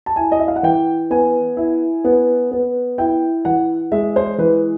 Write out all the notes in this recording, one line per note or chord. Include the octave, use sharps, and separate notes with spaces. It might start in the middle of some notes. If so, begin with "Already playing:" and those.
A5
E4 G#5
D#5
E5
F5
F#5
E3 G5
B3 G#5
E4
B3
B3
E4 G5
E3 F#5
G#3 E5
C5
E3 B4